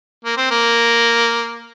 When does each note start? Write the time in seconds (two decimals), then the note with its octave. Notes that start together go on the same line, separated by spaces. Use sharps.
0.25 A#3
0.37 C4
0.51 A#3